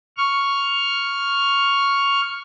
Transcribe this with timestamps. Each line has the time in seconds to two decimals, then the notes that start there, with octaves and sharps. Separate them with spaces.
0.17 C#6 F6